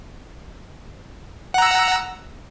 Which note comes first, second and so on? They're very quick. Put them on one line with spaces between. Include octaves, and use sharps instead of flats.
F#5 A#5 E6